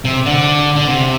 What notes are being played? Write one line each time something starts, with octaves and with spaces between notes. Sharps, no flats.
C3
D3
D3
C3